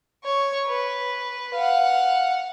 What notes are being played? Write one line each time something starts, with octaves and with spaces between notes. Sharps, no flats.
C#5
B4
F5 F#5